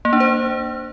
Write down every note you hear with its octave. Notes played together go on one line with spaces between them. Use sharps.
A#3
D4
C5